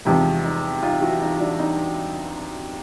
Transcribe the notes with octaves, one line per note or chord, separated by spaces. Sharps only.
E2 C3 F3 G#3 D#4
D#4
D#4 F4
E4 F#4
D#4 F4
D4 E4
D#4